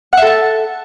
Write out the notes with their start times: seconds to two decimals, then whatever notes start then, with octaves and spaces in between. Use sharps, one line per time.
0.13 F#5
0.17 E5
0.22 A4
0.27 A5